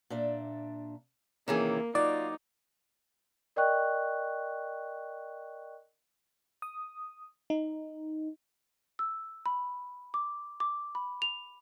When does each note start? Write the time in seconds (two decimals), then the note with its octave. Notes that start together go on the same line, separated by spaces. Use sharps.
0.10 A#2 D4 E5
1.48 C3 D#3 E3 A#3 C#4 G#4
1.95 F#3 D#4 F4 D5
3.56 A#4 D5 D#5 G5 C#6 F#6
6.62 D#6
7.50 D#4
8.99 E6
9.46 B5
10.14 D6
10.60 D6
10.95 B5
11.22 F7